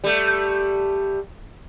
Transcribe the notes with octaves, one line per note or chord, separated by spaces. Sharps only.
G3 A3